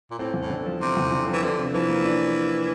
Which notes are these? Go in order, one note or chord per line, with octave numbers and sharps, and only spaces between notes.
A#2
A2 C4
E2
A2
D3
F3
C3 C4
E2
D3
E3 F3
D3 D4
C3
E3 F3
A#3
D4